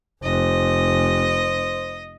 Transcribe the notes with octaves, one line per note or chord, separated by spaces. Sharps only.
F1 C5 D#5